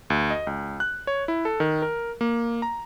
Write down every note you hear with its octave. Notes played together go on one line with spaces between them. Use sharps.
D2
D#5
C#2
F#6
C#5
E4
A4
D#3
A#4
A#3
A#5